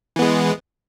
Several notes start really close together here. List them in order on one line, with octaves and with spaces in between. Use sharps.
E3 B3 G#3